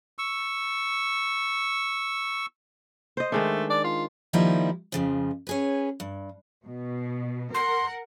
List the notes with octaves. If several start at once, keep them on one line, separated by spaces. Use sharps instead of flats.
C#6 E6
C5 D#5
D#3 G#3 A3 D4
D5
F4
D#3 F3 G3 A#3 D#4 E4
F2 C#3 F3
C#4 G#4 B4
G2
B2
A#4 F#5 C6